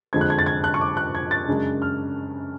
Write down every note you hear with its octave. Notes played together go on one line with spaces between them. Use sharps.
F2 D3 G#3 G#6
F#6
G#6
A6
G#6
F#6
C#6
D6
F#6
G#6
A6
F#2 C#3 G#3 D4
F6